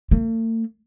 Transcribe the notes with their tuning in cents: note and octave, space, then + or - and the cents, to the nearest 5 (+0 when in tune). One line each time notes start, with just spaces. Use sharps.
A3 +45